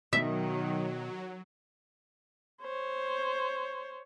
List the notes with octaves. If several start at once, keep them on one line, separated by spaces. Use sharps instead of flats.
B2 D#3 F#3 E5
C5 C#5